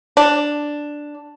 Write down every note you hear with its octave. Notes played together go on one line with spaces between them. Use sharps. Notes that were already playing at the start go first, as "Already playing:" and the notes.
D4